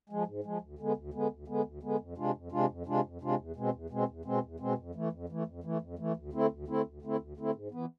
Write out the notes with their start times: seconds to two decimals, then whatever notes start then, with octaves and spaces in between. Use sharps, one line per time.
0.09 F3 G#3
0.27 G#2
0.44 F3 G#3
0.61 D2
0.79 D3 G#3 B3
0.96 D2
1.13 D3 G#3 B3
1.31 D2
1.48 D3 G#3 B3
1.65 D2
1.83 D3 G#3 B3
2.00 F2
2.17 C3 G#3 D4 F4
2.35 F2
2.52 C3 G#3 D4 F4
2.69 F2
2.86 C3 G#3 D4 F4
3.04 F2
3.21 C3 G#3 D4 F4
3.38 E2
3.56 B2 G#3 C4
3.73 E2
3.90 B2 G#3 C4
4.08 E2
4.25 B2 G#3 C4
4.43 E2
4.60 B2 G#3 C4
4.78 F2
4.95 E3 A3
5.12 F2
5.29 E3 A3
5.46 F2
5.64 E3 A3
5.81 F2
5.99 E3 A3
6.16 D2
6.33 D3 A3 C4 E4
6.51 D2
6.68 D3 A3 C4 E4
6.85 D2
7.02 D3 A3 C4 E4
7.20 D2
7.37 D3 A3 C4 E4
7.54 G#2
7.72 E3 B3